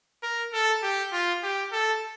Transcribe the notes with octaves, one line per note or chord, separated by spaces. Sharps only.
A#4
A4
G4
F4
G4
A4